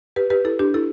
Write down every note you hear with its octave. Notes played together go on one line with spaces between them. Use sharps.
G4 B4
G4 B4
E4 A4
D4 G4
E4 A4